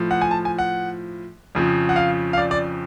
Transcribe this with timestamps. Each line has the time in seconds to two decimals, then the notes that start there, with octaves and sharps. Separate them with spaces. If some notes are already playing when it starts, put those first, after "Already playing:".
Already playing: A2 F3
0.11 F#5
0.21 G#5
0.31 A5
0.45 G#5
0.58 F#5
1.55 F2 C#3 F3
1.89 F#5
1.96 F5
2.33 F5
2.38 D5
2.51 D5